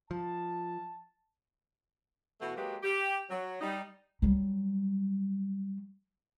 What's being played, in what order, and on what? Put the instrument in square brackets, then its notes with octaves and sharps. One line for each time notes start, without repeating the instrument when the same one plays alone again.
[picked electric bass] F3 [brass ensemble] A5
[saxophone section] B2 E3 A3 F#4
F#3 G#3 A#3 G4 B4
G4
F#3
G3 D#4
[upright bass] F#3 G3